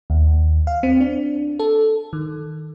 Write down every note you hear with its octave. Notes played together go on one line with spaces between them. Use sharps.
D#2
F5
C4
D4
A4
D#3